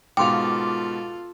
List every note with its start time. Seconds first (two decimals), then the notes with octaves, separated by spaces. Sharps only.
0.17 G#2 B2 F4 A4 F5 G5 C6 D6